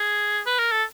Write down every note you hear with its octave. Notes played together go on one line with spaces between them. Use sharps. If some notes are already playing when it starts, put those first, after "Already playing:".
Already playing: G#4
B4
A#4
A4